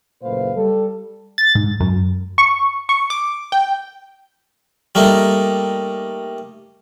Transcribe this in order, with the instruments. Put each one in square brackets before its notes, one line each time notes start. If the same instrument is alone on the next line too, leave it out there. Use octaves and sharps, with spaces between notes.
[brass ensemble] F#1 A#2 A3 B4 C5 F5
G3 A4
[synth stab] A6
G#2
F#2
C#6
C#6
D6
G5
[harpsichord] G3 A3 A#3 D#4